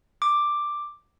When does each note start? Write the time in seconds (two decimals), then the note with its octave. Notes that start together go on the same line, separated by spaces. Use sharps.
0.22 D6